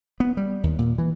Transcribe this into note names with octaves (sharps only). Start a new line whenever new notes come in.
B3
G3
D#2
A#2
E3